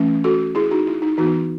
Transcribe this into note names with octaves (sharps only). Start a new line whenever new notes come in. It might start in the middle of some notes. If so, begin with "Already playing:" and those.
Already playing: E3 A3 C#4
F#4 A4
E4 G#4
D#4 F#4
E4
D#4
E3 B3 D#4 F#4